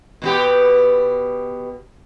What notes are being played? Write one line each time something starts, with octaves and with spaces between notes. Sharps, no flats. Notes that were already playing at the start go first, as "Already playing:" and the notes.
B2 B3 G4